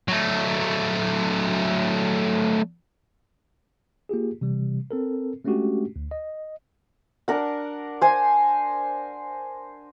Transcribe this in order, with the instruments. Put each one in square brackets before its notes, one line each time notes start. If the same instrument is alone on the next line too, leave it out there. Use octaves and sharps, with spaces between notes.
[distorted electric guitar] F#3 A3
[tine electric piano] A#3 F4 G4 G#4
C3 E3 G3
C4 A4 A#4
G#3 A3 C#4 D4 F#4 G4
D2
D#5
[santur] D4 A#4 F#5
C5 G#5